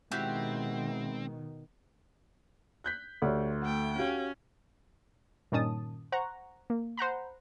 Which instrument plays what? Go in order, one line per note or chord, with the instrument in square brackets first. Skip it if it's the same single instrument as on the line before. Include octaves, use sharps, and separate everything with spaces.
[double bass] B2 D#3 [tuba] G#3 [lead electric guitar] C4 [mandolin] E4 F#4 G4
[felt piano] F#6 G6 B6
[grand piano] D2 [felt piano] G4 C#5 D5
[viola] A3 G5 [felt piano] F#5
[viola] C#4 [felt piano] F#4 G4 F5
[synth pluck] G2 A#2 D#3 C#4 A5 D#6
C5 F#5 A#5 C#6
A#3
C5 F#5 A#5 B5